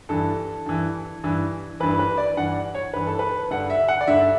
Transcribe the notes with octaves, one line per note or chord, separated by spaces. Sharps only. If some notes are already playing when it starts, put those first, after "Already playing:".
G2 E3 A4
G2 E3
G2 E3
G2 E3 B4
B4
D5
G2 E3 F#5
C#5
G2 E3 B4
A4
B4
G2 D3 F#5
E5
F#5
D5
G2 D3 E5